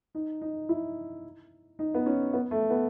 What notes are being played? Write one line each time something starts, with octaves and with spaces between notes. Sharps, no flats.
D#4
D#4
E4
D#4
B3
C#4
B3
A3
B3